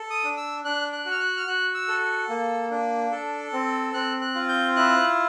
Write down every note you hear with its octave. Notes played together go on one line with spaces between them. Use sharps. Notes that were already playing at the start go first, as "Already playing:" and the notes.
Already playing: A4
D#6
D4
E6
D4 F#6
F#6
F#4
F6
F#6
F6
F#4 F#6
E6
A4
A#3
D4
A4
C4
C4 F#6
F#6
F4
G6
E4 F#6